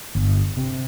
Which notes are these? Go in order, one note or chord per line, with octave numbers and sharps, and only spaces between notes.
G1
C3